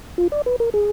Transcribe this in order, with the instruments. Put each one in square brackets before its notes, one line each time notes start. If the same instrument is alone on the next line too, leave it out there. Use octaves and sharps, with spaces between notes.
[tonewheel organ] F4
D5
B4
A#4
G#4